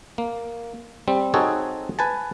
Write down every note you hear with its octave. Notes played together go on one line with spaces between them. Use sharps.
A#3
G3 C4
C4 D#4 F#4 G#4 A4 C#5
B4 G#5 A5